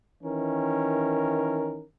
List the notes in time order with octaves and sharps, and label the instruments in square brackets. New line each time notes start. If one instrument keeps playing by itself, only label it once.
[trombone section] D#3 E3 C#4 A#4